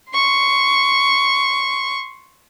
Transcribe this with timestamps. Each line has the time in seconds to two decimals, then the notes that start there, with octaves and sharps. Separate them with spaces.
0.12 C6 C#6